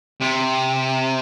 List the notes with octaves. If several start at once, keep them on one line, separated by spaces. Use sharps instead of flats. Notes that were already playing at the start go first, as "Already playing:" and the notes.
C3